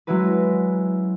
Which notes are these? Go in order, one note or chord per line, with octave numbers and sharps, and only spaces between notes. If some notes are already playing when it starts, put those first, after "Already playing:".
F#3 G#3 C#4 E4 F#4 B4